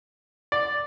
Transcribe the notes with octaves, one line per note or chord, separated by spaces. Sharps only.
D5